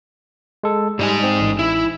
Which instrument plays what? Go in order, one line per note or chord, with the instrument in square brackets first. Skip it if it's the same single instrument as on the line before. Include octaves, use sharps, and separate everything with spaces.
[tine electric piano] G#3 A4
[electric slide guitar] G#2 D#4 G#5 [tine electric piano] G3
[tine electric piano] C4
A1
[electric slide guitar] E4